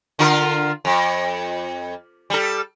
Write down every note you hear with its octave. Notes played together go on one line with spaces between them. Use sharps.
D3 F4 A#4
F2
G3 A4